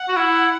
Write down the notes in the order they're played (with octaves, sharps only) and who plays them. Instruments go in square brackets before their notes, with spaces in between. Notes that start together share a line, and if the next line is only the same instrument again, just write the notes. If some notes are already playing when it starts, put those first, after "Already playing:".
Already playing: [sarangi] F#5
[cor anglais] F#4
E4